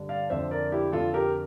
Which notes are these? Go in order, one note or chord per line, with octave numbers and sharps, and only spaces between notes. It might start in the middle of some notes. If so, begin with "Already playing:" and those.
Already playing: G2 D3
D5 F5
F2 D3 C5 E5
A#4 D5
E4 G4
F2 D3 F4 A4
G4 A#4